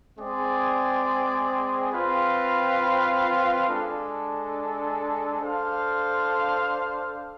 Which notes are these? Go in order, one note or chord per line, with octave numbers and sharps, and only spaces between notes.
G#3 C4 G#4 D5
C4 F4 B4 F5
G#3 D4 A4
D4 A4 C5 F5